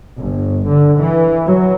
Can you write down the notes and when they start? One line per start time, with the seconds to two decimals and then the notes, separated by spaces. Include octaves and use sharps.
0.19 G1
0.67 D3
0.98 E3
1.47 F#3